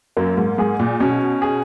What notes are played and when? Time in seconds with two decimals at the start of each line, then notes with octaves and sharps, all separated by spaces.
0.17 F#2 A#3
0.37 G#2
0.58 G#2 G#4
0.79 A#2
1.00 B2 C#4
1.42 G#4